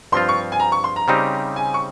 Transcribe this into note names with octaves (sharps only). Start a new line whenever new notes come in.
G2 F3 C4 F4 C6
C#6
G#5
A#5
C#6
C6
A#5
C#3 G3 C4 D#4 G4
G#5
C#6